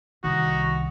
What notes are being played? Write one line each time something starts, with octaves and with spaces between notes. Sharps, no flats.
C2 D#3 D#4 F#4